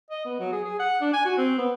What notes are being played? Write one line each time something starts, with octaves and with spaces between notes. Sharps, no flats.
D#5
B3
F#3
G#4
G#4
F#5
D4
G#5
F#4
C4
B3